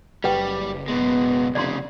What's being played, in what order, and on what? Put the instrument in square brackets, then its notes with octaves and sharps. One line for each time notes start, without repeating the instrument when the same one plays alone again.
[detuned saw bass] F#1 [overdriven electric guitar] G3 [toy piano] G4 B4 G5
[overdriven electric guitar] B2 G#3 [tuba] B3
[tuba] F1 [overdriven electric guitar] C2 C#3 [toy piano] D5 A#5 C6